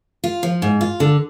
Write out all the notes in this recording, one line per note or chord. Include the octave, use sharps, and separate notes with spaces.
F4
F3
G#2
F4
D3